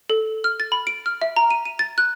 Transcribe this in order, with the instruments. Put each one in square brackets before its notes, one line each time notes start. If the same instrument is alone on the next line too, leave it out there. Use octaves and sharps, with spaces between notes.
[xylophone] A4
F6
A6
B5
D7
F6
E5
A#5
D#7
D#7
A6
F#6